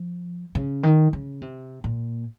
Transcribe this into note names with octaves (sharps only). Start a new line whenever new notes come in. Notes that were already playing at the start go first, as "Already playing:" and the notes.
Already playing: F3
C#3
D#3
C#3
C3
A#2